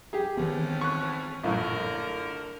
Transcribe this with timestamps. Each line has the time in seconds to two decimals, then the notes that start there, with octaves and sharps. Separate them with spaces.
0.13 G4 G#4
0.37 F2 G#2 D#3 E3 B3 C#4
0.81 C#6 F#6
1.43 A#1 F#2 A2 D3 A#4